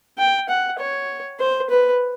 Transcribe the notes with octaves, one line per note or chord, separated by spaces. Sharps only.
G5
F#5
C#5
C5
B4